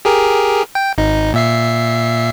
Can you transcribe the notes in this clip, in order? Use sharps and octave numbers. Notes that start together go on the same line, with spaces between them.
G4 G#4 A#4
G5
G#1 D#4
A#2 E5 C7